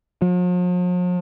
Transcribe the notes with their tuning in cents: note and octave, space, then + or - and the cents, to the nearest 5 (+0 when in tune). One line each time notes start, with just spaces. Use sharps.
F3 +45